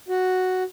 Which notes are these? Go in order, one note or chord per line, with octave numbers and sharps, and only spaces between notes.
F#4